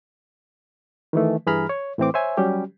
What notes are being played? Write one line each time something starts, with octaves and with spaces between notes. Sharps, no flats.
D#3 E3 A3
G2 E3 G#4 A#5 B5 F6
C#5
A2 E3 C4 D6
C5 C#5 E5 G#5
F#3 G3 C#4 G4